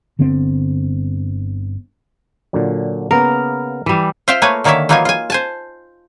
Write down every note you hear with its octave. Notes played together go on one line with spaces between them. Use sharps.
G1 D3 B3 C4
A#2 D3 F#3
C#3 A#3 B3 A#4
E3 G3
F4 C5 E5 F5 G5
A3 A#3 A#4 B4 C#5 G#5
D3 D#3 A#3 C#5 D5 E5
E3 F#3 A#3 D#4 F4 G#5
F4 G#5
C5 G#5 A5